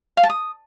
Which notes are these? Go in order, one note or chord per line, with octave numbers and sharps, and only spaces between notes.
F5
A5
D#6